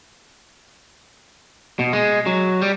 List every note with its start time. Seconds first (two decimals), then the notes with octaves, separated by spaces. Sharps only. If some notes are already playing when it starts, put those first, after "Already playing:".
1.79 B2
1.93 G#3
2.26 F#3
2.62 G3